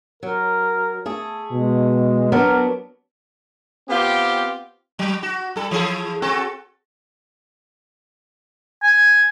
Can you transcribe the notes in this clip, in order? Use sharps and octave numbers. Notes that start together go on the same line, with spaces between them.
F#3 A#4
A3 G#4
B2 G#3
F#3 B3 D4 A#4
B3 C4 F4 G4
F#3
F#4
G3 A4
E3 G#4 A4
C4 F#4 A4
G#5